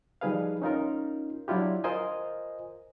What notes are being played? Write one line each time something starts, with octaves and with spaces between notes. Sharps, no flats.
F3 G3 D#4 G#4 B4 F5
C#4 D#4 F4 A#4
F#3 D4 E4 F4 G4
F4 A#4 C5 D#5 G#5